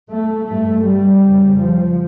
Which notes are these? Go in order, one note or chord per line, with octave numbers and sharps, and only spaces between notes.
A3
G2 A3
G3
F2 C#3
F3